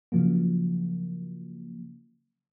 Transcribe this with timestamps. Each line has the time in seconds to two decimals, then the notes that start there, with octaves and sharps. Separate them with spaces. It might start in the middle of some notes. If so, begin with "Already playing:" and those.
0.12 C#3 F3 F#3 A#3